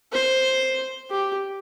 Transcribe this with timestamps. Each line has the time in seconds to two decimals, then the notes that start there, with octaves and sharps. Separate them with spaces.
0.12 C5
1.11 G4